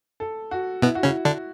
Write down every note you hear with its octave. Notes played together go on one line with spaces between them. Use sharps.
A4
F#4
B2 B3 E4
F#4
C#3 C#4
E4
D3 D4